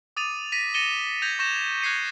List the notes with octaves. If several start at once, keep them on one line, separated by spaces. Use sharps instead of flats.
D6 D#6 A6 D#7 F7
A#6 B6 D#7
A6 A#6 C#7 D#7 E7 G7
G6 G#6 A#6 D#7 F7
C#6 G6 A#6 E7
F#6 G#6 A#6 C7 C#7 D#7